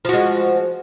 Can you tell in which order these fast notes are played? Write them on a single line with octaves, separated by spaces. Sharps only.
F3 F#4 G#3